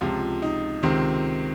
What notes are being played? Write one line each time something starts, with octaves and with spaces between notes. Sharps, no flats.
C#2 C3 F3 F4
D#4
C#2 C3 D#3 C4